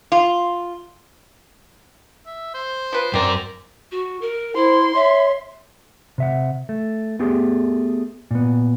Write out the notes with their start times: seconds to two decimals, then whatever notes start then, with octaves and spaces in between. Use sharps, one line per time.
0.12 F4
2.26 E5
2.54 C5
2.92 F3 B4
3.14 F#2 C4 A#4 D5
3.91 F#4
4.21 A#4
4.55 E4 C5 C6
4.95 C#5 E5
6.18 C3 E5 F#5
6.69 A3
7.19 A3 B3 G4 G#4
8.31 A#2 B3